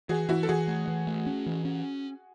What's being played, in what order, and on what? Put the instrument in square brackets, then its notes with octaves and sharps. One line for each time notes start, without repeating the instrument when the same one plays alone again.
[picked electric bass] E3 [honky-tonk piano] F#4 G#4
[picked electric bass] E3 [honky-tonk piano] E4 F#4
[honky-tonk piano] A4
[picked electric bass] E3 [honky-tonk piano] F#4 G#4
[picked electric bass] A3
E3
A3
C#4
E3
C#4